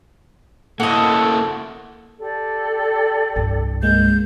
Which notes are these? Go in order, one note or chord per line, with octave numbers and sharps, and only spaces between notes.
A#3 E4 F#4 A4 D#5
G4 A4 D5
C2 G2
G#3 A#3 G6